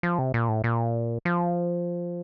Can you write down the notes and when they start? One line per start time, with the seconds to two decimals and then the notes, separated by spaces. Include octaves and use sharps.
0.03 F3
0.19 C3
0.34 A#2
0.48 A2
0.64 A#2
1.25 F3